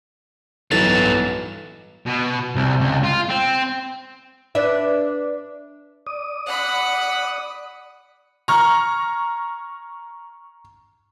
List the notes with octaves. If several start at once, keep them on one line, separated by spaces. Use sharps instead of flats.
B1 G2 E3 F#3 B3 A4 A6
B2
C2
C#2
F4
C4
D4 B4 E5
D5 D#6
F#5 B5
A#5 C#6 F6